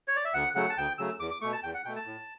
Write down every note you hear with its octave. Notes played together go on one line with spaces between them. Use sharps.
C#5
D5
E5
D2 F#5
C#3 F#3 A3 F#5
A5
D2 G5
C#3 F#3 A3 E6
E2 D6
D6
B2 A3 C#6
A5
E2 G5
F#5
B2 A3 G5
A5
A2